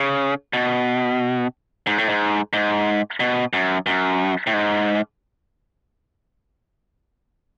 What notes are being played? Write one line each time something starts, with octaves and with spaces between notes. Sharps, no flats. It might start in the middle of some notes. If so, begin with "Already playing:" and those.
Already playing: C#3
B2
G#2
A2
G#2
G#2
B2
F#2
F#2
A2
G#2